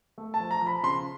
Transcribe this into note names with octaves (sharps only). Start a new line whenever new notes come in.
A3
A5
F3
A#5
F3
B5
C#3 C6